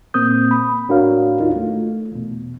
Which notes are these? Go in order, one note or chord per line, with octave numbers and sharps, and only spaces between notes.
A#2 A#3 C4 D#6 G6
B5
A2 D4 F#4 A#4 C#5 F5
D#2 D#4 F4
A3
E2 B2